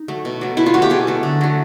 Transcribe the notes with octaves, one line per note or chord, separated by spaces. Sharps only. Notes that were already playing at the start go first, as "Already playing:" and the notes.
Already playing: D#4
F#3 A3
B2
F#3 A3
B2 E4
F4
F#3 A3 F#4
G4
B2 G#4
F#3 A3
D3
F#3 A3